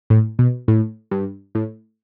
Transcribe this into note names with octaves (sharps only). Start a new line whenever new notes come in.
A2
B2
A2
G2
A2